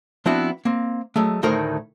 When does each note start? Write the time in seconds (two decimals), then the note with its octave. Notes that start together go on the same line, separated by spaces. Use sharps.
0.26 F3 B3 C4 D4 E4 F#4
0.65 A#3 C4
1.16 F#3 G#3 A3
1.43 D2 A2 D#3 A3 A#4 C5